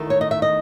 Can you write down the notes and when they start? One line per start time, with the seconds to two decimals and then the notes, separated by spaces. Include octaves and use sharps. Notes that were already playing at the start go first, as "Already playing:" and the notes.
Already playing: E2 D#3 A3
0.10 C#5
0.21 D#5
0.31 E5
0.42 D#5